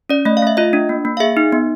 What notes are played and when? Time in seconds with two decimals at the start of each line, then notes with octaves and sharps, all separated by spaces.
0.09 C#4 D5
0.25 A3 D#5
0.37 F5
0.42 A3 E5
0.57 F4 D#5
0.73 D4
0.89 A#3
1.05 A#3
1.17 F5
1.20 G#4 E5
1.37 D#4
1.52 B3